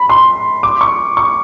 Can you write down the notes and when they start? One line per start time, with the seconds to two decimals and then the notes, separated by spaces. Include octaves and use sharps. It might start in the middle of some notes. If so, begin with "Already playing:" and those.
Already playing: B5
0.10 C6
0.63 D6
0.81 C#6
1.17 C#6